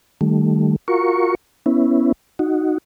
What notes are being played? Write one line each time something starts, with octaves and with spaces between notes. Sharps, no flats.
D#3 G3 A3
F4 F#4 A#4 C#6
B3 C#4 E4
D#4 F#4